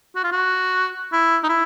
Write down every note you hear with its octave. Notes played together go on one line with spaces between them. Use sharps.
F#4
F4
F#4
E4
D#4
E4